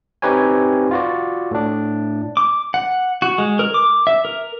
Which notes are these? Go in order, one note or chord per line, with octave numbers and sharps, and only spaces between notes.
C4 D#4 G4 B4 C#5 G#5
F4 F#4 D5
A2 D4
D6
F#5
F#4
G#3
A#4
D6
E5
A#4